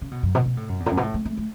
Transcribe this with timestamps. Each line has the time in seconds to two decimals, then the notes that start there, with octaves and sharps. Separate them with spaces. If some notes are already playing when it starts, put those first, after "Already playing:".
0.02 C#3
0.11 B2
0.23 F#2
0.35 B2
0.46 B2
0.57 A2
0.69 F#2
0.80 E2
0.86 A2
0.91 F#2
0.97 B2
1.03 A2
1.14 A3
1.25 A3
1.37 A3